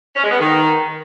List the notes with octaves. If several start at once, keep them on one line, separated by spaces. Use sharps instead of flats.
C#4
G#3
B3
D#3